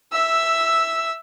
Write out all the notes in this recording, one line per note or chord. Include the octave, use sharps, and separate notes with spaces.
E5 E6